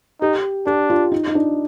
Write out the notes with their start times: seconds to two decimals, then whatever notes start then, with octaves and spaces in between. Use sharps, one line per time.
0.21 D#4 G4
0.67 D4 G4
0.90 F4
1.12 D#4
1.27 D#4
1.35 D4